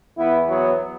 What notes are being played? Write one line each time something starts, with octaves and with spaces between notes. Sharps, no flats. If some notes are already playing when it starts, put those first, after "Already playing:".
E2 E3 B3 E4
F#3 B3